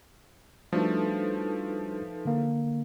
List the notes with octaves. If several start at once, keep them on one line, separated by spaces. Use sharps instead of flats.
F3 G3 A3 D4 D#4 F#4 A4 B4
D3 A#3